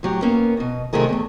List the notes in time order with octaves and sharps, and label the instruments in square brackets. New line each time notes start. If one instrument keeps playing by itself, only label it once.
[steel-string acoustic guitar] A2 F#3 G4
A#3 B3 C#4
B2 D#5
C3 D#3 F#3 A3 G#4 A#4
E2 A3